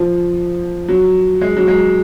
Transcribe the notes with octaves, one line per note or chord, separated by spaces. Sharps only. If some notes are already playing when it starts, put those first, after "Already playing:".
Already playing: F3
F#3
G#3
F#3
G#3